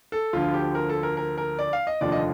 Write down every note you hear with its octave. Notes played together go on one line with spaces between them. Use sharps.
A4
D2 D3 F3 F4
G4
A#4
A4
A#4
A#4
A#4
D5
F5
D#5
F1 D#2 D3 F3 D5
D#5